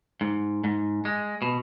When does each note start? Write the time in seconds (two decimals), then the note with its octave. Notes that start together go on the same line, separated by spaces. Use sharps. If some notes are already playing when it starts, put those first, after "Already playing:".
0.21 G#2
0.64 G#2
1.05 G#3
1.42 B2